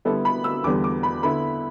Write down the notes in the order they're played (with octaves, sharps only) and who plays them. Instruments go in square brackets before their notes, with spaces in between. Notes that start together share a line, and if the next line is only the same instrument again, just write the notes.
[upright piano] D3 G3 B3 E4 A4
B5
E6
E2 D3 G3 B3 D6
D6
B5
D3 B3 E4 B5